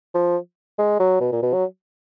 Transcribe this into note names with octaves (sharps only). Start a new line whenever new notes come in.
F3
G#3
F#3
B2
A#2
B2
F#3